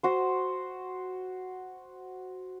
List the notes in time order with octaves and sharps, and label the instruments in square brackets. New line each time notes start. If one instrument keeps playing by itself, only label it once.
[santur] F#4 C5